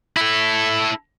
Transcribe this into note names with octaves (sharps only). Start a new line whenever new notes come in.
E4 A4